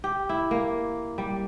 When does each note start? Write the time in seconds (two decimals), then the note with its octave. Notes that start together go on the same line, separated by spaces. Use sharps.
0.04 G4
0.29 E4
0.51 A#3
1.18 G3